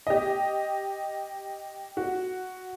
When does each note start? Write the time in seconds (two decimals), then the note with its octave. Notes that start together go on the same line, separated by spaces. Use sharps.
0.07 G4 D#5
1.97 F#4